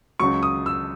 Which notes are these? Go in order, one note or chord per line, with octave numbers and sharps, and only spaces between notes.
C#2 C#3 F#3 C#6
D#6
E6